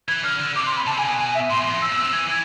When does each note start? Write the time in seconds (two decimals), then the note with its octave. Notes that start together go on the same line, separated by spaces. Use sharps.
0.08 E3 G#6
0.24 D3 F6
0.40 D3
0.56 C3 D6
0.67 C6
0.77 B5
0.86 C3 A5
0.97 D3 G#5
1.07 B2 G#5
1.19 G#5
1.35 E5
1.49 A2 C6
1.60 E2
1.71 F2
1.81 A2 E6
1.92 B2
1.97 E6
2.03 C3
2.12 E3 G#6
2.29 E3 G#6